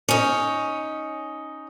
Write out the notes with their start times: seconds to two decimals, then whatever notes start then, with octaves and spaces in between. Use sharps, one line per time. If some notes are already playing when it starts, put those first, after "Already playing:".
0.09 C#4 D#4